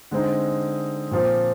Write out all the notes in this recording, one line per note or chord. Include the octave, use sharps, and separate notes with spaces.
D3 G#3 C4 D#4
A#2 F3 C4